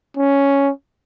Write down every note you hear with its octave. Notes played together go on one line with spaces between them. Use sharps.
C#4